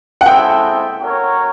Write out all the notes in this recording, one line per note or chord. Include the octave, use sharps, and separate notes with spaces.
F#5
G#3 C4 E4 A4 G5
F#4 A#4 C#5